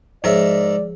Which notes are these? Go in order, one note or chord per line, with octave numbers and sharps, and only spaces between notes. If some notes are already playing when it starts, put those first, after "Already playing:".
G#2 F3 G#4 A#4 C#5 D5 E5